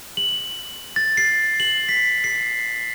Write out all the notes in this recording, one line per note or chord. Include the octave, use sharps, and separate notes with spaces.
F#7
A6
C7
F#7
B6
C7